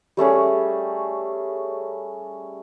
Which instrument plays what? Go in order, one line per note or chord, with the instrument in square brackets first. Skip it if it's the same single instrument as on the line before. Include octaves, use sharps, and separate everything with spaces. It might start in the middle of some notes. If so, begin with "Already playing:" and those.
[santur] G3 A3 C#4 G#4